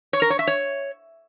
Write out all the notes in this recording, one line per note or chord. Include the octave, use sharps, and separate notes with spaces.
C#5
A#4
C#5
E5
C#5